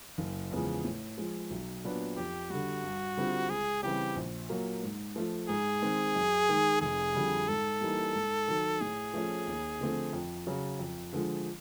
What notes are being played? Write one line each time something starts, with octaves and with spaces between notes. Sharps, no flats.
F#1
E2 C#3 F3 G#3
A2
F3 G#3
B1
A#2 F#3 B3 D4
F2 G4
D3 G3 F#4
G2
D3 G3 C4 F4
C#2 G#4
C#3 E3 G3 C4 G4
A#1
A#2 F#3 A#3
G#2
F3 A3
G#2 G#4
D#3 G#3 C4
F#2
D#3 G#3
F1 G#4
F2 D3 G3
G#2 A4
E3 G3 A#3 D#4
G#2
D#3 F#3
A2 G#4
F3 A3 C#4
D#2
D3 F3 A3 C4
F2
C#3 F#3
F2
D3 F3 G#3